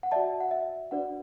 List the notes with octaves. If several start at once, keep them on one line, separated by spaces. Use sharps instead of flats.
F#5
F#4 D5 E5 A5
F#5
E5
D4 F#4 B4 D5 F#5